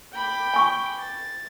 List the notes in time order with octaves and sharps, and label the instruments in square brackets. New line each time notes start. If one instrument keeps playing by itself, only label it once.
[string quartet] G5 B5 D6
[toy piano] G#5 C#6
[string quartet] A6